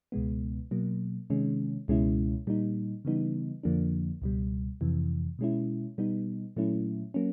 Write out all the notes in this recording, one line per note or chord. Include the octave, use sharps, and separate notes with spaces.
C#2 B2 G#3 B3
B2 F#3 A#3
C3 D#3 G#3 C#4
C#2 B2 G#3 C#4 E4
A#2 G3 A#3 D#4
C#3 E3 G3 B3 D#4
F2 D3 F3 A#3 D4
C#2 B2 G3
F2 C3 E3
B2 G#3 C#4 E4
B2 G3 B3 D#4
A#2 F#3 A3 C#4 E4
F#3 A#3 C#4